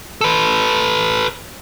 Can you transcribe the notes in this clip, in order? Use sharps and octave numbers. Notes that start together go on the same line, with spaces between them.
A4 B4